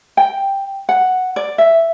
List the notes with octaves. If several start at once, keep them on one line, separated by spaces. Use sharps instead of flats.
G5
F#5
D5
E5